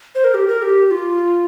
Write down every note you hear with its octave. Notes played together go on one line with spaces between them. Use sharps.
C5
A#4
G4
A#4
G4
F4